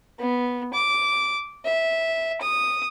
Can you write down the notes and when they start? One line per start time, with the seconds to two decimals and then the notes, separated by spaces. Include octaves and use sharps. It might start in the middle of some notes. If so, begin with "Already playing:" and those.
0.19 B3
0.73 D6
1.65 E5
2.41 D#6